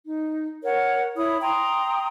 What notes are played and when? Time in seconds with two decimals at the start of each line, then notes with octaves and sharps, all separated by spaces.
0.06 D#4
0.63 A#4 C#5 F#5
1.16 E4 C#5 B5 D#6
1.41 G5 A#5 C6 D#6